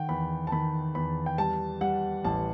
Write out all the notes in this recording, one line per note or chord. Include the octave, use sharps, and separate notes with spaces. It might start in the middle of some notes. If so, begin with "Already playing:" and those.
Already playing: D#3 F#5 G5
E2 B5
A5
D#3 B5
E2 B5
G5
G3 A5
G3 F#5
A1 A5